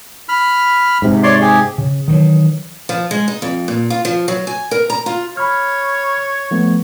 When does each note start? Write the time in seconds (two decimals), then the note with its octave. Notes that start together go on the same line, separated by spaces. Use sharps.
0.29 B5 F6
1.02 G#2 C3
1.23 C#5 D5 C6
1.41 G4 G#4
1.78 C#3
2.08 D#3 E3 F#3
2.89 F3
3.11 G#3
3.28 D#4
3.42 F2
3.68 A#2
3.90 F4
4.05 F3
4.28 F#3
4.47 G#5
4.71 A#4
4.90 A#5
5.06 F4
5.37 C#5 B5 F6
6.51 F3 A3 B3